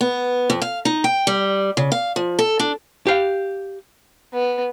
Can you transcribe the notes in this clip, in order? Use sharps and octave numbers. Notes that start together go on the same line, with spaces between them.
B3
F2
F5
D#4
G5
G3
C#3
F5
F3
A4
D4
G4 F5
B3